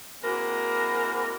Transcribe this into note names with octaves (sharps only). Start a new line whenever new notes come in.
G#3 A#3 C4 E4 F#4 A#4